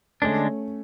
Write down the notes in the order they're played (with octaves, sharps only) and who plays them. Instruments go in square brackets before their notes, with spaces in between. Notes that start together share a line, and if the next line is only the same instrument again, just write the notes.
[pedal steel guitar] D3 G#3 D4 [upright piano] A3 C#4